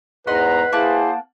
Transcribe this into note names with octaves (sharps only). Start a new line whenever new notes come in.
E2 G#2 B4 D#5 F#5 A#5 C6
A#3 E4 G#4 C5 F#5 A5